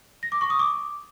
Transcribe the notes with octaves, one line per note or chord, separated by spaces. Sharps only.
A#6
D6
C#6
D#6
D6